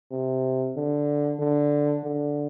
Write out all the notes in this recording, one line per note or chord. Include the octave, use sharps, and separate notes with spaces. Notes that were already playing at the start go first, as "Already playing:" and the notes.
C3
D3
D3
D3